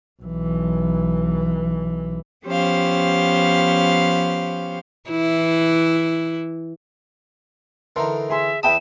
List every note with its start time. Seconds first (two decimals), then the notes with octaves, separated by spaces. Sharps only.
0.23 B1 E3
2.45 F3 B3 C#4 G4 C5 F5
5.10 E3 E4
7.96 D3 E3 D#4 A4 A#4 C6
8.30 G#4 E5 G#5 C6
8.63 E2 E5 G5 A5 B5 D#6 E7